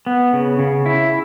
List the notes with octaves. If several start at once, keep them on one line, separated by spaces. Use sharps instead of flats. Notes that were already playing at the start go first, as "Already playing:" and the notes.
B3
C#3
C#3
E4